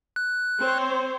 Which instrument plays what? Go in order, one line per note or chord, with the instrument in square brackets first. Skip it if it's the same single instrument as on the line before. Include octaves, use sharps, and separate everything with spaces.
[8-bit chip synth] F#6
[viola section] C4 C5 C#5